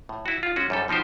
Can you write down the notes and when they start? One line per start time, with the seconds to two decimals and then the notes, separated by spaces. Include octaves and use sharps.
0.09 A2
0.26 E4 F#4
0.43 F4
0.56 G#3 C#4 F#4
0.70 F#2 G3 A4
0.88 B2 F3 D#4 G4 C5